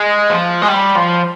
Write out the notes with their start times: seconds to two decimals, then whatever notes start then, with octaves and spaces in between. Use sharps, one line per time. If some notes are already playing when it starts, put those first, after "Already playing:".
Already playing: G#3
0.30 F3
0.62 G#3
0.68 G3
0.95 F3